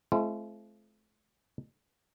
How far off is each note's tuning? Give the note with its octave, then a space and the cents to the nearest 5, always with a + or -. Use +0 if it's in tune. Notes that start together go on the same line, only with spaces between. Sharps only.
A3 -45 C4 +0 F4 -45